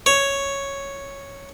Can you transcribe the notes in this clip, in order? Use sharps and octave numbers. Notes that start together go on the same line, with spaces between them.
C#5